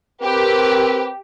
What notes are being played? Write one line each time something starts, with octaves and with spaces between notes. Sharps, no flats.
C4 G4 A#4 B4